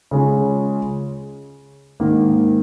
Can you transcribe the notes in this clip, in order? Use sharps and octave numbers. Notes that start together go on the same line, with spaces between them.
C#3 G#3 C#4 F4
G#2 D#3 A#3